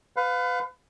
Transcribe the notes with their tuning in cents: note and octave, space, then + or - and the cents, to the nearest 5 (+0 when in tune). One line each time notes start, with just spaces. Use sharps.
B4 +30 F5 +30